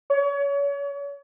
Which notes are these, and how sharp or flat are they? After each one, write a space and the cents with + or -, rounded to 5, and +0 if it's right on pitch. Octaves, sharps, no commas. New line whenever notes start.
C#5 +35